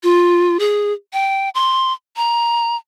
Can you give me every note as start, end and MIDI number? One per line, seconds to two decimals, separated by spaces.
0.03 0.57 65
0.59 0.93 68
1.13 1.49 79
1.55 1.93 84
2.17 2.76 82